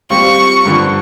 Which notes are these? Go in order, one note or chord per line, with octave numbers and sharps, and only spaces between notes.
G3 C4 F4 C#6
G2 D3 F3